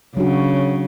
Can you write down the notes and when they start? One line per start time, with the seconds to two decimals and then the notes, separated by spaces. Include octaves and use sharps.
0.17 C#3 F#3 D4 F#4